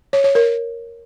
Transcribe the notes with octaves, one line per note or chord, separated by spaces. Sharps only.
C#5
C#5
A#4